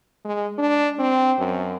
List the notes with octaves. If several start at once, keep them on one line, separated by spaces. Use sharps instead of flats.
G#3
D4
C4
F#2